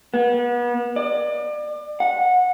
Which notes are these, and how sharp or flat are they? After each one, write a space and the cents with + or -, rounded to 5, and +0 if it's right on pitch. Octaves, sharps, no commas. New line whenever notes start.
B3 -35
D5 +35
F#5 -20